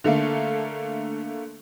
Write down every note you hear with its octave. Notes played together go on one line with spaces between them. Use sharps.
D3 A3 A#3